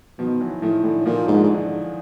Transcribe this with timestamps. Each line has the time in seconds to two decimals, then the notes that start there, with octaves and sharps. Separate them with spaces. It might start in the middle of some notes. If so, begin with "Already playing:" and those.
0.19 B2 D#3 F3
0.41 E3 F#3
0.62 A2 D#3 F3
0.83 A2 D3 E3
1.06 A#2 D#3 F3
1.28 G#2
1.34 D3 E3
1.43 G#2
1.53 D3